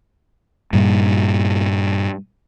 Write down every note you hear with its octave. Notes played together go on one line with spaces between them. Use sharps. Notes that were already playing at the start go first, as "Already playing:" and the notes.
G2 A#2 G3